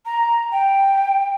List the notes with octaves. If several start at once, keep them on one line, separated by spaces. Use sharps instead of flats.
A#5
G5